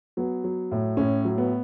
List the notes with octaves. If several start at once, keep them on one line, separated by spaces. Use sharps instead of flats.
F#3 B3
F#3
A2
A2 C#4
F#3
B3